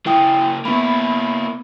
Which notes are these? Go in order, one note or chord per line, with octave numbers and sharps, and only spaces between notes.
C#3 A#3 E4 G5 D#6
A#3 B3 E4 B5